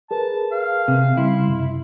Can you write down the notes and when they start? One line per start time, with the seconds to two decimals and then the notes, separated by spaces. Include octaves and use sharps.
0.11 G#4 A#4 B4 A5
0.52 F5
0.88 C3
1.17 C#3 G3 E4 C6
1.48 F#2 C3